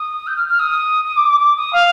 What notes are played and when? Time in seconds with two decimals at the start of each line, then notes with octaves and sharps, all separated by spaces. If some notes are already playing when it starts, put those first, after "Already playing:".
Already playing: D#6
0.27 G6
0.36 F6
0.48 F6
0.59 D#6
1.05 D#6
1.16 D6
1.28 D6
1.39 D6
1.56 D#6
1.73 F5